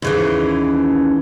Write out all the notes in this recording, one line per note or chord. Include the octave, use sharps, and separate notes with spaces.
D#2 C#3 E3